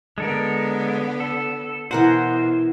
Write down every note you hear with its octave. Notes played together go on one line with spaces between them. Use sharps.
D3 G#3 B3 A4 A#4
A4
B2 E3 A#4 C5 F#5